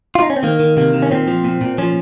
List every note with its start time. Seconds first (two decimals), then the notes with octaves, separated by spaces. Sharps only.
0.15 F4
0.22 D#4
0.30 C#4
0.36 C4
0.43 D#3 A#3
0.60 D#3
0.77 C3 A#3
0.94 D#3
1.02 C#4
1.11 A#2 C4
1.28 F3
1.45 A#2
1.61 A#2
1.78 F3 C#4